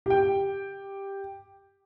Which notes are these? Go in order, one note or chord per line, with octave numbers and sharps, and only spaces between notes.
G4 G5